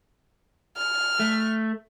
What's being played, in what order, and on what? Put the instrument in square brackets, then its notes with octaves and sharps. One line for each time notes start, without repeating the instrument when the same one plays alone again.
[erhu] F6
[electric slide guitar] A3